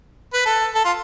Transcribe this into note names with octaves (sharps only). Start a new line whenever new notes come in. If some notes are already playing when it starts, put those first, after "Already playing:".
B4
A4
A4
F4